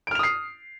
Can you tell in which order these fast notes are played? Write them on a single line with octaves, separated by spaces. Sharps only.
D7 F6 F7 D#6 C7